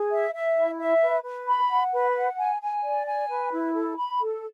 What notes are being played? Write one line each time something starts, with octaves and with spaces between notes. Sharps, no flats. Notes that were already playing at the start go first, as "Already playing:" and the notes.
Already playing: G#4
E5
E5
E4
E5
B4
B4
B5
F#5
B4
F#5
G#5
G#5
D5
G#5
B4
E4
A4
B5
A4